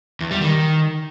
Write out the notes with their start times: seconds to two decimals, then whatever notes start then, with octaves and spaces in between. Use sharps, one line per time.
0.20 E2
0.31 G3
0.41 D#3